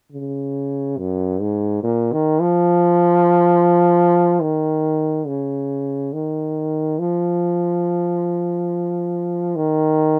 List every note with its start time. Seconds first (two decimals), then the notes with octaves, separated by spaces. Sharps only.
0.12 C#3
0.97 F#2
1.41 G#2
1.83 A#2
2.13 D#3
2.41 F3
4.41 D#3
5.27 C#3
6.13 D#3
6.99 F3
9.56 D#3